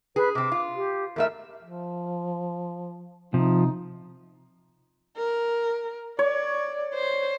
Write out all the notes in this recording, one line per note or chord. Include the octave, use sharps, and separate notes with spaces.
G#4 B4
C3 C4 D6
F4
G4
E2 A3 A#4 E5
F3
C3 F3 D#4
A#4
C#5 D5
C5